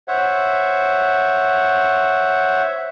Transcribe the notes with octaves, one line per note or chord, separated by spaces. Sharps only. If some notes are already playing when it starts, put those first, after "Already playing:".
C5 C#5 E5 F#5